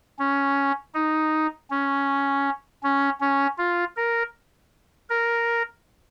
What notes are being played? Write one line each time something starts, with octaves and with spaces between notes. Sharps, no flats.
C#4
D#4
C#4
C#4
C#4
F4
A#4
A#4